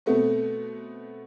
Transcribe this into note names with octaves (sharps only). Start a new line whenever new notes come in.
B2 A3 B3 C4